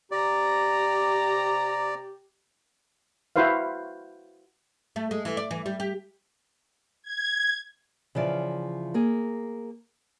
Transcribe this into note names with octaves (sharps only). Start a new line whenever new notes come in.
C3 G4 D5 A#5
E4 F#4 B4 C5 F5
A3
G#3
E3
D5
E3
G3
G4
G#6
C#3 E3 F3 D5
A#3 G#4